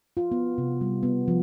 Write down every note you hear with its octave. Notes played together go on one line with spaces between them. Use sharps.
F4
B3
C3
G3
B3
F3